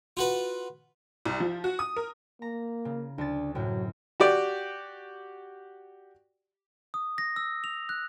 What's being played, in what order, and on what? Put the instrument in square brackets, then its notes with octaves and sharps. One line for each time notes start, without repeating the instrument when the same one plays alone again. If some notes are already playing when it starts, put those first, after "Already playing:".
[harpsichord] F4 F#4 B4
[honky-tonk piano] C2
F3
F#4
D#6
A#4
[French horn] A#3 [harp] A#5
[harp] C#3
[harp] D2 A6 [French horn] D4
[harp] F#2 A2 C3 [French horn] F#3
[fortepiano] F#4 G4 D5
[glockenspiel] D#6
A#6
E6
F7
F#6